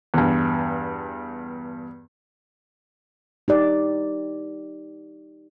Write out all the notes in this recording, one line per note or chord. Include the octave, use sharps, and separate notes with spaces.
E2 G2
D#4 G4 D5